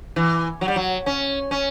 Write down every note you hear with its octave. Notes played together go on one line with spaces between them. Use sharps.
E3
F#3
G3
F#3
C#4
C#4